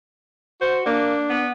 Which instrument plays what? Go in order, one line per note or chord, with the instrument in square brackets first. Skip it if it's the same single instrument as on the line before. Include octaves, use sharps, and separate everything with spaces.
[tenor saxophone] F#4 [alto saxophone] C5
[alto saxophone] A#3 [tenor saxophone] D4
[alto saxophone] B3